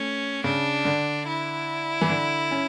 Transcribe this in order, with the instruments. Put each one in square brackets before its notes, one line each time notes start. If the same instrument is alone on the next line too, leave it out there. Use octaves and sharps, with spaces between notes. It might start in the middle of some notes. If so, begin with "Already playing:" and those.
Already playing: [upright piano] A3 [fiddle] C#4
[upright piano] C#3 [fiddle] D4
[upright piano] D3
[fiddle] E4
[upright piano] E3
D3
C#4